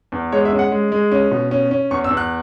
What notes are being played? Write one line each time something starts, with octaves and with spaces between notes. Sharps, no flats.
E2
G#3 C#5
E5
C#4
F#5
G#3
G#3
C#4
B2
C#4
C#4
E2 C#6
E6
E2
F#6